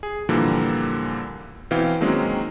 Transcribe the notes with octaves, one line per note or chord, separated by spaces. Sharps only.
G#4
A#2 D3 E3 F3 G3 A#3
B2 E3 C4 F5 G5
D#3 F#3 G#3 A#3 C4 C#4